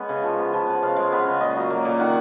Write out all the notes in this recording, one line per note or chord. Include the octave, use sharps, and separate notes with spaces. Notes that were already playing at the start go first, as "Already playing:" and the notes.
Already playing: G#3 B3 C#4
C#3
F3
B3
F3
B3
C#3 F5
G#3
B3
C#3
A#2 D#5
F#3
A#3
A#2
D#3 F#5